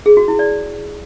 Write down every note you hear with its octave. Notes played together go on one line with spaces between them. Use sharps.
G#4
F#4
E4
D5